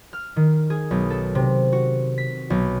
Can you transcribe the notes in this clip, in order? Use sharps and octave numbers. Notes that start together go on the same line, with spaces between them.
F6
D#3
G#4
B1
A4
C3
F#4
B6
B1